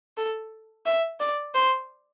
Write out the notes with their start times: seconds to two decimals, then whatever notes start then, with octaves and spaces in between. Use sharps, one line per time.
0.17 A4
0.86 E5
1.20 D5
1.54 C5